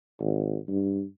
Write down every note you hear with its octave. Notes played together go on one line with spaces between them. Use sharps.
G#1
G2